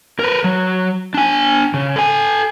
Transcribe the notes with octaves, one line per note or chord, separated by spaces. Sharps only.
A#4 B4
F#3
D4 G#5
C#3
A4 G#5